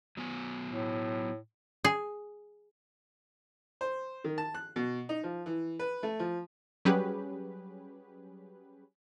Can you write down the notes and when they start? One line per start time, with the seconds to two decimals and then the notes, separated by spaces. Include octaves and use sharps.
0.17 F#3 B3 G#5
0.68 A2
1.84 G#4
3.81 C5
4.24 D#3
4.38 A5
4.55 F#6
4.76 B2
5.09 D#4
5.24 F3
5.46 E3
5.79 B4
6.03 A3
6.19 F3
6.85 F#3 G3 C#4 G4 G#4 B4